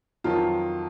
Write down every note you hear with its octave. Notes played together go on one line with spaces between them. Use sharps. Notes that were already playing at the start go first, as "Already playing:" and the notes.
F2 D#3 F#3 F4